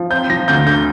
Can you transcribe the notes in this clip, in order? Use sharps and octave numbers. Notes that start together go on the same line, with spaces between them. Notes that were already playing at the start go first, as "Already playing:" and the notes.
Already playing: F3
C4 G6
F3 A#6
D2 G6
D3 G6